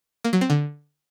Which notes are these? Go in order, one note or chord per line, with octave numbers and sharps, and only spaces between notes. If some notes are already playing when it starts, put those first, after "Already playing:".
A#3
F#3
C4
D3